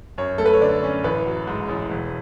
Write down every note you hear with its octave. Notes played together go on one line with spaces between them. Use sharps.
F#2 C#5
A3 A4
B4
C#5
D3 D5
C#4
A1 B4
F#3
G#2
A1
E1